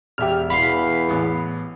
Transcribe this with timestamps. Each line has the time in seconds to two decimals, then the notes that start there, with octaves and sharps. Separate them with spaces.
0.18 E1 G4 E5 F6
0.50 E2 F5 B5 C6
1.09 A1 B3